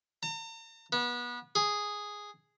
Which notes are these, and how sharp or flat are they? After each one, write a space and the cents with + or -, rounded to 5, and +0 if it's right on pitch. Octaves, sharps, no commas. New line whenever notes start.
A#5 -45
B3 -30
G#4 -5